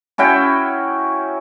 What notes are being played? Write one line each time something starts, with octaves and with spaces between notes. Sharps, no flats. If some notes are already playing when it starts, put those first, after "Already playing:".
C#4 E4 F#4 G5